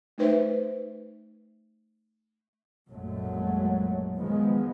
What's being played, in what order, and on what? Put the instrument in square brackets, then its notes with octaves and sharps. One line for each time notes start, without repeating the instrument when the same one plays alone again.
[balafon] A3 D#4 B4 C5 E5
[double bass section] A#1 F#2 A#2 F#3 G#3 A3
D#3 F3 G#3 B3